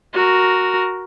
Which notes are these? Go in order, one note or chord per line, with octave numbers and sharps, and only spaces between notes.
F#4 A#4